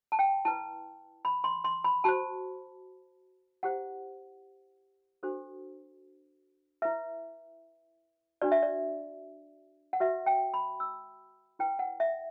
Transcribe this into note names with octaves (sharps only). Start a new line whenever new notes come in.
A5
G5
E4 B4 A5
B5
C6
C6
B5
F#4 C5 A5
E4 G4 C5 F#5
D4 F#4 A4 C5
E4 B4 E5
D4 F#4 B4 D5
E5
D5
F#5
F#4 B4 E5
G5
B5
E6
E4 B4 G5
F#5
E5